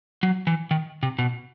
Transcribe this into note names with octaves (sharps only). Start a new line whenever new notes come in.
F#3
E3
D#3
C3
B2